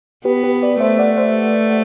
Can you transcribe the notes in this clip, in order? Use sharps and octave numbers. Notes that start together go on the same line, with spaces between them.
B3 G4 B4
G4 B4
B4 D5
A3 C5 E5
D5 F#5
C5 E5